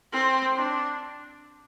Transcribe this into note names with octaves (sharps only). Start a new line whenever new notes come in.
C4
D4